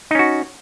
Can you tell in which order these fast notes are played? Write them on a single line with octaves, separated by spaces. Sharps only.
D#4 C#4 F#4